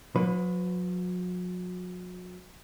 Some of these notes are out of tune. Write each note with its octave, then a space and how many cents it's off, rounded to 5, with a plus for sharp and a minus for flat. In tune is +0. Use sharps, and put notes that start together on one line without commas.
F#3 -40 B4 +20